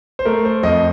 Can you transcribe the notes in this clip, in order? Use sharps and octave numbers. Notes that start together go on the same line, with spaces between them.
C5
A3 A#4
C5
F2 D#5